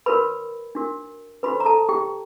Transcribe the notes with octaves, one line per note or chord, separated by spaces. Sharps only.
F#4 A#4 B4 C#5 B5
D4 F#4 A#4
D4 F#4 A4 B4 C5 B5
A#5
A4 A5
G4 G5